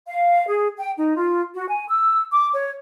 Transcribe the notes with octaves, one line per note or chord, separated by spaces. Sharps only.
F5
G#4
G5
D#4
F4
F#4
G#5
E6
D6
C#5